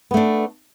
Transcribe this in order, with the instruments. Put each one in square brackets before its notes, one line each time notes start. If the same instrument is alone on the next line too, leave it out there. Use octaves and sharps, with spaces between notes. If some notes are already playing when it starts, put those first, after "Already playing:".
[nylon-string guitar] B3
A3
D4